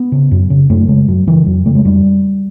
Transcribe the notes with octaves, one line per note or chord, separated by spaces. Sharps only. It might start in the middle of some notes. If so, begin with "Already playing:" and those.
Already playing: B3
C#3
F#2
C#3
F#2 A3
C#3 G#3
F#2 F#3
C#3 E3
F2 F#3
C#3 A3
G#3
F2 G3